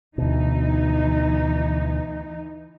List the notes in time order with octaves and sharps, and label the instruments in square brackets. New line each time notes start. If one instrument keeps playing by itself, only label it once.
[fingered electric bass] D2 B2 [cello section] E3 D#4